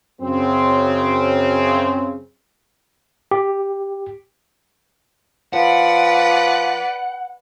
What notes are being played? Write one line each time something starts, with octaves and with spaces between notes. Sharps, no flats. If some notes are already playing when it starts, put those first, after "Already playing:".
F#2 C#3 C4
G4
F3 B4 D5 F#5